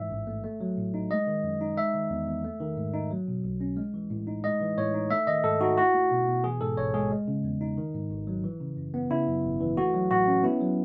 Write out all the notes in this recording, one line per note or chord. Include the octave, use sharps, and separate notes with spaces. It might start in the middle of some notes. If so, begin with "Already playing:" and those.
Already playing: G#2 E3 E5
A1
A3
A3
F#3
A2
D#4
G#3 D#5
D#3
F#2
D#4
G#3 E5
D#3
E2
E2
A3
D#3
G#2
D#4
F#3
B2
B1
C#4
G#3
E3
A2
D#4
G#3 D#5
E3
A2 C#5
D#4
A3 E5
D#3 D#5
G#2 A4
D#4 F#4
E4 F#4
A3
B2
B2
E3 G#4
G#2 A4
A1 C#5
G#3 G#4
G#3
C#3
E2
D#4
D#3
G#2
G#1
F#3
E3
C#3
F#2
B3
C#3 E4
F#2
G#1
E3
A3 F#4
F#3
A2 F#4
C#4
B3 E4
F#3